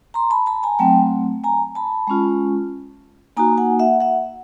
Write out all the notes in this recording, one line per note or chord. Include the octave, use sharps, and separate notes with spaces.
A#5 C6
A5 B5
A5 B5
G#5 A#5
F#3 A3 C4 G5 A5
G#5 A#5
A5 B5
G#3 C#4 F4
A#3 D#4 F#4 G#5 A#5
F#5 G#5
E5 F#5
E5 F#5